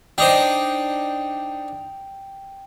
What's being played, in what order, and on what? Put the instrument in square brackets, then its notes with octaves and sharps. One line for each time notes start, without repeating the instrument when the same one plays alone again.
[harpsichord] D4 D#4 C5 [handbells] G5